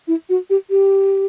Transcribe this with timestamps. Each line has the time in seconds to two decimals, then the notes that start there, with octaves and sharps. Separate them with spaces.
0.08 E4
0.29 F#4
0.50 G4
0.70 G4